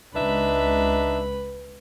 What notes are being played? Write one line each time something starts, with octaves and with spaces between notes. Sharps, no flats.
C#2 D4 D#4 B4 E5 B5